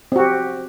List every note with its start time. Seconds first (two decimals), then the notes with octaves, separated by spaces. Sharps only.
0.12 C4
0.16 F#4
0.20 G4